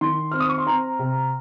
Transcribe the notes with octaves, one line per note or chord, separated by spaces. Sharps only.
D#3 C6
C4 F6
D#6
C#6
C6
C4 A#5
C3